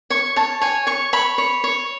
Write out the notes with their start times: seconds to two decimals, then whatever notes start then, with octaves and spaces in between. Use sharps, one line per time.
0.10 C#5 C#6
0.36 C#5 A5
0.61 C#5 G#5
0.87 C#5 C#6
1.13 C#5 B5
1.38 C#5
1.64 C#5